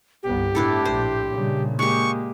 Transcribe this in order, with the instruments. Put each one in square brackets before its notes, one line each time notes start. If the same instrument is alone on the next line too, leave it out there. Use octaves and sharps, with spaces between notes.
[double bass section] G1 C2 B3 [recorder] G4
[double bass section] A2 [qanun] D4 E4 A4
[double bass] A#1 [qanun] C5
[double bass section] A#2 [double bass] C#3 G3
[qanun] G#3 G4 [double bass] A#3 [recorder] C#6